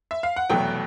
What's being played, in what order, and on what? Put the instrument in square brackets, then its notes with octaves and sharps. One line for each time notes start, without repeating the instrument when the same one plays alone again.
[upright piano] E5
F5
F#5
F1 E2 B2 F#3 A3 G5